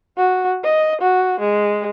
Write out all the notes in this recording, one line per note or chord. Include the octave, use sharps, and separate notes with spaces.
F#4
D#5
F#4
G#3